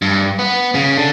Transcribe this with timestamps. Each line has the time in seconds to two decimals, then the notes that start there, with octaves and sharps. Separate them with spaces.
0.02 G2
0.39 B3
0.75 C#3
0.97 D3